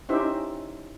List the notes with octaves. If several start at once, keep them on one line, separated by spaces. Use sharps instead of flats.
C#4 D#4 E4 G4 C5 E5